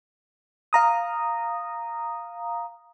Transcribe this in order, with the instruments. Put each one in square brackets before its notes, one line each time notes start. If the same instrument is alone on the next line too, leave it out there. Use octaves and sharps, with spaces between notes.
[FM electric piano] F5 A#5 D#6